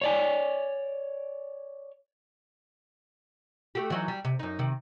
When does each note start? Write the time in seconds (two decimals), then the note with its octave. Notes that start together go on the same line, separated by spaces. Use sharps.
0.01 C#5 D5 G#5
3.75 A3 F#4 G4
3.90 E3 F#3 D#4
4.08 G3
4.25 C3
4.39 F#2 D#4
4.59 C3 D#3